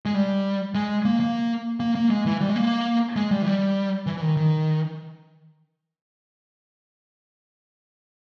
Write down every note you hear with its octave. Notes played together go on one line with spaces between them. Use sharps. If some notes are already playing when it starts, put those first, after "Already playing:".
G#3
G3
G#3
A#3
A#3
A#3
A#3
G#3
E3
G3
G#3
A#3
G#3
G3
E3
G3
E3
E3
D#3
D#3